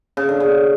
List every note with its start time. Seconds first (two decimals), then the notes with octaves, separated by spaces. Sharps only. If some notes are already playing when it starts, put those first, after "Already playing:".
0.17 C#3
0.29 D3
0.40 C#3